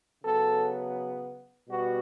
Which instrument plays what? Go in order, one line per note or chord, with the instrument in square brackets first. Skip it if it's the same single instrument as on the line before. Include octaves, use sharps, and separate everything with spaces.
[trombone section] C#3 F#3 B3 A4
B2 G3 B3 F#4